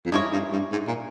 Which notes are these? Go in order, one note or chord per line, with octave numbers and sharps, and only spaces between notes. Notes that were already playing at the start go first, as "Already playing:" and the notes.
F2
G2 G#3 E4 A#4 C#5
G2
G2
G#2
A#2